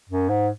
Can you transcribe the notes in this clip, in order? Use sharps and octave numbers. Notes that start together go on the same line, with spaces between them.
F#2
G#2